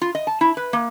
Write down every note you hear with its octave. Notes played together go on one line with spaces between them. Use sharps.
F4
D#5
A5
E4
B4
A#3